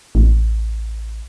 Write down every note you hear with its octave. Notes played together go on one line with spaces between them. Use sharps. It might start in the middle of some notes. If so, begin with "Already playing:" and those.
A1